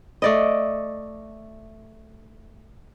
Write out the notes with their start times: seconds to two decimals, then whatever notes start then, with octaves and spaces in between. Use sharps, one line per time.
0.22 A3 D5 D#5